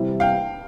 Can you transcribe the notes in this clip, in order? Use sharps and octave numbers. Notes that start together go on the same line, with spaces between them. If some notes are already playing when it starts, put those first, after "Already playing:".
Already playing: C3 E3 G3 C4 E4
F5 G5